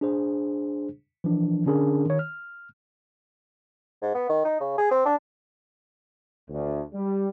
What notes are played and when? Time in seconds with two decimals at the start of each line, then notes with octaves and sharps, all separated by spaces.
0.01 D4 G#4 C5
1.24 E3 F3 D4
1.66 D3 C#4 D4 G#4 A#4
2.06 D#3 C#5
2.19 F6
4.02 G#2
4.15 B3
4.29 D#3
4.45 D#4
4.61 C#3
4.78 G#4
4.91 C4
5.06 D4
6.49 D2
6.93 G3